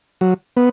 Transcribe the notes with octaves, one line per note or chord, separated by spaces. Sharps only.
F#3
B3